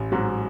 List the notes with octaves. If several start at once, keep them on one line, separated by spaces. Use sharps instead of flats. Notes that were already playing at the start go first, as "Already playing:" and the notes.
Already playing: A1
G#2 F#3